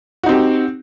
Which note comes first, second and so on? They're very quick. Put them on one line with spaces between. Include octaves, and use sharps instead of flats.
F#4 D#4 C4 G4